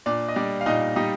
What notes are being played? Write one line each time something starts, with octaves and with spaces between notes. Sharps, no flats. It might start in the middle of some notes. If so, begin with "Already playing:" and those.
A#2 D4 D5
D#5
G3 D4 D5
F5
A#2 D#4 D#5
G3 D#4 D#5